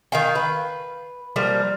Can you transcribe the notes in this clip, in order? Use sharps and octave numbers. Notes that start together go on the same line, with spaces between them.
D#3 F5 G5
B4
F3 G3 A#3